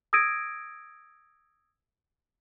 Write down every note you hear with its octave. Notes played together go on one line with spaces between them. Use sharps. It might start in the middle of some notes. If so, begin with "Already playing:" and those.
D#6 E6 G#6 A#6 D7 D#7